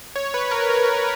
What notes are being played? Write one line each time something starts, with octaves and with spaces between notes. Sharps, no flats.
C#5
B4
A#4
A#4
C#5